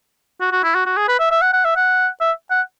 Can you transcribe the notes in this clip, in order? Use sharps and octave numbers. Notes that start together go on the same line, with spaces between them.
F#4
F#4
E4
F#4
F#4
G#4
B4
E5
E5
F#5
F#5
E5
F#5
E5
F#5